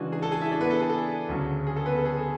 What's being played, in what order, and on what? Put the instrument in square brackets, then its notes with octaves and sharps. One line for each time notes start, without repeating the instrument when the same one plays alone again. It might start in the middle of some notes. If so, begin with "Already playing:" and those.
Already playing: [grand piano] C#3 E3 G#3 D4 F#4
G#4 G#5
A4 A5
G#4 G#5
E4 E5
D4 D5
B3 B4
A4
G#4
A4
D2 C#3 F#3
G#4
A4
B3 B4
A4
G#4
A4